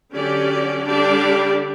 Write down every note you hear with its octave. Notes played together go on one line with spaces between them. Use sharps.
D3 F#3 C#4 G4 D5
D3 G3 D4 G4 D5